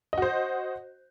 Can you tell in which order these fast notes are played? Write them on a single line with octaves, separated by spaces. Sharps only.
D#5 F#4 C5